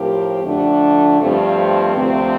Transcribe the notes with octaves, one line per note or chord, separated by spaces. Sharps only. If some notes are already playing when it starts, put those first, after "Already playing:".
Already playing: A2 F3 C4 G4 A#4
F2 D3 A3 D4
G2 F3 A3 C4
D2 C3 F3 A3 C4